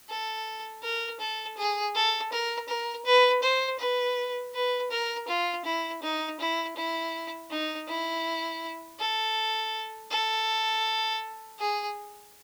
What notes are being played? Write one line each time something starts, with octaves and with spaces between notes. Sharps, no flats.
A4
A#4
A4
G#4
A4
A#4
A#4
B4
C5
B4
B4
A#4
F4
E4
D#4
E4
E4
D#4
E4
A4
A4
G#4